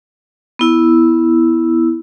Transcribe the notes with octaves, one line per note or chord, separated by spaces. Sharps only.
B3 E4 E6